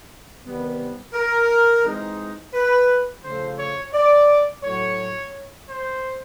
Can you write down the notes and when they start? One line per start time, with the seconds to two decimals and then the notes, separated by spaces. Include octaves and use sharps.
0.44 C3 D#3 G3 B3
1.14 A#4
1.84 E3 G#3 C4 D#4
2.54 B4
3.24 C#3 F3 A3 C5
3.59 C#5
3.94 D5
4.64 A2 F#3 A3 C#5
5.69 C5